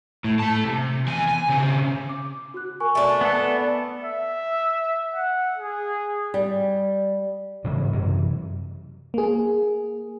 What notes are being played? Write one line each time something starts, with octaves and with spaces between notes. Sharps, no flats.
A2
A3 A5
C3
E2 G#5
G#5
C#3 C4
D6
F#4 F#6
A#4 G#5 C#6
A3 D4
B3 A4
E5
F#5
G#4
G3
G#2 C#3 E3 F#3
F#2 C3 E3
A#3 G#4